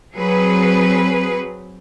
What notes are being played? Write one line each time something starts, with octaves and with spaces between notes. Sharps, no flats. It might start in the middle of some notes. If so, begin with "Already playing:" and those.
F#3 C4 G#4 B4